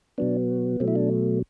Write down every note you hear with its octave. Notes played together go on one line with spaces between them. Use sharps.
B2 F#3 B3 D4
B2 F#3 A3 C4
E4
D4